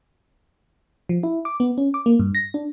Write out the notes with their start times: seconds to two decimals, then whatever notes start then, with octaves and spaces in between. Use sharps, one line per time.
1.09 F3
1.23 E4
1.45 D6
1.60 B3
1.78 C#4
1.94 D6
2.06 A#3
2.19 G2
2.35 A#6
2.54 D4